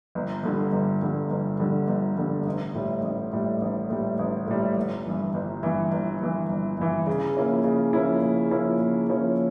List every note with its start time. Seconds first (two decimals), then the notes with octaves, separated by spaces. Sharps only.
0.15 G1
0.43 G2 D3 G3
0.72 G1
1.02 G2 D3 G3
1.30 G1
1.59 G2 D3 G3
1.88 G1
2.17 G2 D3 G3
2.46 A1
2.75 A2 G3
3.03 A1
3.33 A2 G3
3.62 A1
3.90 A2 G3
4.19 A1
4.47 A2 G3
4.77 G1
5.05 G2 E3
5.34 G1
5.63 G2 E3
5.91 G1
6.20 G2 E3
6.50 G1
6.78 G2 E3
7.07 C#3
7.36 F3 A#3 C#4 E4
7.64 C#3
7.93 F3 A#3 C#4 E4
8.23 C#3
8.51 F3 A#3 C#4 E4
8.80 C#3
9.09 F3 A#3 C#4 E4